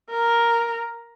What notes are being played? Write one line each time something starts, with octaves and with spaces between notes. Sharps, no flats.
A#4